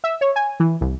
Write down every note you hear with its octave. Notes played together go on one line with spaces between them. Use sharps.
E5
C#5
G#5
E3
C2